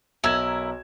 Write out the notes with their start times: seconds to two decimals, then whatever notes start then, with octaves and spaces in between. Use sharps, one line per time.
0.24 B1 E4 A#4 G#6 E7